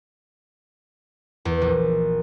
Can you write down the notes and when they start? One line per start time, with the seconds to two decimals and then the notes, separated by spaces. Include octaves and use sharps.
1.45 E2
1.62 A#1